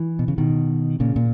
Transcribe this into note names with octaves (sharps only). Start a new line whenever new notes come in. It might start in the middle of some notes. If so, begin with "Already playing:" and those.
Already playing: E3
B2
C#3
B2 D#3
A#2 C#3
A#2